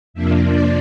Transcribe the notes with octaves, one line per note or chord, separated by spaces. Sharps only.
F2 C3 F3 A#3 D4 E5
D5